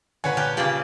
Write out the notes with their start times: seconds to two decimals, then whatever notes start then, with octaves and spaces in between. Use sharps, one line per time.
0.24 A#2 D3 B4 C#5 F#5 G#5
0.37 G4 A5 F6 F#6
0.57 A#2 C#3 A#3 G4 D5 G5